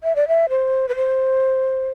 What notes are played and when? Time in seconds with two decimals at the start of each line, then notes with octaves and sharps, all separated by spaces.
0.04 E5
0.16 D5
0.28 E5
0.49 C5
0.89 B4
0.96 C5